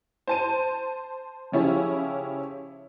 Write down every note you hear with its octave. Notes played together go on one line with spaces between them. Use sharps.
C5 A5 D#7
C#3 F3 C#4 E4 G4